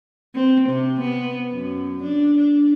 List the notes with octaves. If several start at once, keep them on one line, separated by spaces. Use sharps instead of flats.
C4
C3
B3
F#2
D4
D4